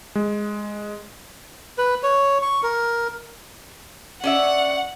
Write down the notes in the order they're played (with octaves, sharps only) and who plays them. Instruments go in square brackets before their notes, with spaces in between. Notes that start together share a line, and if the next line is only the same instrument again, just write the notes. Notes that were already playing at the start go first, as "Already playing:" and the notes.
[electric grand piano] G#3
[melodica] B4
C#5
C#6
A#4
[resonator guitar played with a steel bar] C#4 D5 E5 [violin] F#5